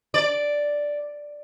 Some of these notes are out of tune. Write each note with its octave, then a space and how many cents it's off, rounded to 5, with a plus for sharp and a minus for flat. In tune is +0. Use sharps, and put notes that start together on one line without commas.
D5 +0